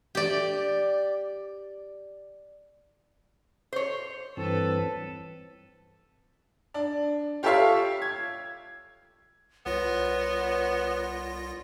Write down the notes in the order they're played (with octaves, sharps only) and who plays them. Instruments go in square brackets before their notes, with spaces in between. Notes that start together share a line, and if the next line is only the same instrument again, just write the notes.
[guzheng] G4 D5
[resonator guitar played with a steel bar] C5 C#5
[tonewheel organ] G2 E3 C4 [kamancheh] A4 B4
[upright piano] D4
F4 G4 A4 C#5 E5 F5
G#6
[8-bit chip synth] C2 F4 A#6 [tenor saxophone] B3 [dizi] C#5